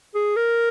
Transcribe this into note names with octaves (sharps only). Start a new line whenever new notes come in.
G#4
A#4